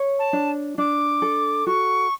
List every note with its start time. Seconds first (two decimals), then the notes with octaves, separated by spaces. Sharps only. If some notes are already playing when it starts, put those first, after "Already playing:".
Already playing: C#5
0.19 A5
0.33 D4
0.78 D4 D6
1.22 A4
1.66 F#4 C#6